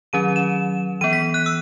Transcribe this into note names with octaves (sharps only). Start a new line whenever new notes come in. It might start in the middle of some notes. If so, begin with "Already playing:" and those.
D#3 F#3 C#4 D#7
E7
E3 B3 D#7
B6
F#6
E6